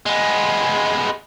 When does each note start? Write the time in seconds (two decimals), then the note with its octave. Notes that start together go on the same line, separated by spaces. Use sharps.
0.06 G#3 B3